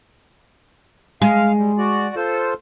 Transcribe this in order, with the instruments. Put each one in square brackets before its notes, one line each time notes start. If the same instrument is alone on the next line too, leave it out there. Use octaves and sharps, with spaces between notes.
[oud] G#3 [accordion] F5
[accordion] G3
F#4 D5
F4 A4 C5